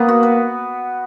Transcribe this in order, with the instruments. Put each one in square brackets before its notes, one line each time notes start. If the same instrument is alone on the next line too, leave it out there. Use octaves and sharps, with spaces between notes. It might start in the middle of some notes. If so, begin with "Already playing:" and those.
Already playing: [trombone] A#3 [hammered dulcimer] B3
[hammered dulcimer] F#4
B4